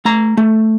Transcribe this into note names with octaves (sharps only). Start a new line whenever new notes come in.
A3 A#5
A3